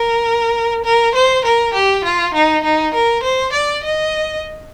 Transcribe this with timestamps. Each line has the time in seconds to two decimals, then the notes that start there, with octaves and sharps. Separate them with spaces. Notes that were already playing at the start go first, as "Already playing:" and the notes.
Already playing: A#4
0.84 A#4
1.15 C5
1.45 A#4
1.74 G4
2.04 F4
2.34 D#4
2.64 D#4
2.94 A#4
3.23 C5
3.53 D5
3.84 D#5